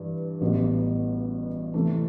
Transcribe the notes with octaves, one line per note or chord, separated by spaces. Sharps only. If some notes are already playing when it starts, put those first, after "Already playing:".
Already playing: G2 E3
A1 A2 G3 B3 F#4
C3 E3 A3